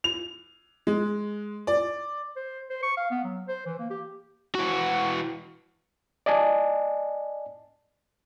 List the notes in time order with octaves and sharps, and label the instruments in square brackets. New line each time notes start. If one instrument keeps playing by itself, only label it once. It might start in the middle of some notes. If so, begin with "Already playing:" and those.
[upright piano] F7
G#3
D5
[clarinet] C5
C5
C#6
F5
B3
F#3
C5
E3
A#3
G4
[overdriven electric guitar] E3 F#4
[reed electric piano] D5 D#5 G#5 A5